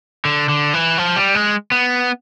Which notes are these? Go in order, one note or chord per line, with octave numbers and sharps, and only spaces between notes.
D3
D3
E3
F3
G3
G#3
B3